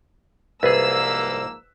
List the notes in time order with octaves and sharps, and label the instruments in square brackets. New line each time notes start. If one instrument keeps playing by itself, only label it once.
[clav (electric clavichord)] C2 G#4 [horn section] G#2 F3 A#3 [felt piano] B4 [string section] E6